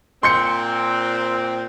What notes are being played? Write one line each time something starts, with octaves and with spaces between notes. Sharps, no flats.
A#2 C4 C6 G6 C#7